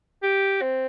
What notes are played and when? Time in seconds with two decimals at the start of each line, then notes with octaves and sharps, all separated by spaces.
0.23 G4
0.61 C4